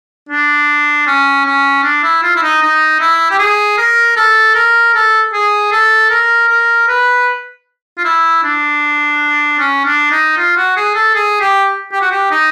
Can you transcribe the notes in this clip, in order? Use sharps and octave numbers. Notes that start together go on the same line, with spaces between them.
D4
C#4
C#4
D4
E4
F4
E4
D#4
D#4
E4
G4
G#4
A#4
A4
A#4
A4
G#4
A4
A#4
A#4
B4
F4
E4
D4
C#4
D4
D#4
F4
F#4
G#4
A4
G#4
G4
G4
F#4
G4
D#4